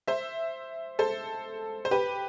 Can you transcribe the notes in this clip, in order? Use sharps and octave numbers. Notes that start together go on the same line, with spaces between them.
C5 E5
A4 C5
C5
G4 B4